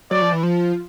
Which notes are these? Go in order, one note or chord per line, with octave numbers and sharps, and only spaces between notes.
F#3 D5
F3
E3
F3